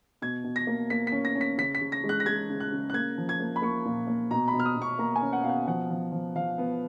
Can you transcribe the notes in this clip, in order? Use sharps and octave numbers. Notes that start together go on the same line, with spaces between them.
B2 G#6
B2
A#6
A#3
A#3 B6
B6
C#4
A#6
C#4
B6
C#3 B6
B6
C#3
A#6
G#3
F#6
A#6
G#3 G#6
C#3
F#6
C#3
F#6
A#3 G#6
F3
G#6
A#3
B5
A#3 C#6
A#2
A#3
B2 A#5
B5
B2
F6
D#6
B2
C#6
A#3 A#5
G#5
C#4
F#5
B2 F5
F#5
F3 F#5
F3
F3
F3 F5
B3